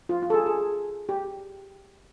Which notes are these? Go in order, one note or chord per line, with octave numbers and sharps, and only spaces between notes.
F4
F4
A4
G#4
G#4
G4